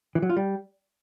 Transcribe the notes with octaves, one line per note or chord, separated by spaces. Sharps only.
E3
F#3
F4
G3